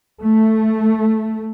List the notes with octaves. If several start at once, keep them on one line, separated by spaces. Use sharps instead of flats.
A3